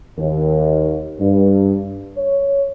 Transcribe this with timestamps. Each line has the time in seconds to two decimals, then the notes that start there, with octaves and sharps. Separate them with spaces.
0.17 D#2
1.20 G2
2.17 C#5